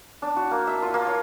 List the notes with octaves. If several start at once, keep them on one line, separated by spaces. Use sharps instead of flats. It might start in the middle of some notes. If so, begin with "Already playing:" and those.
D4
F#4
A#3
E5
F4
A#3
C#5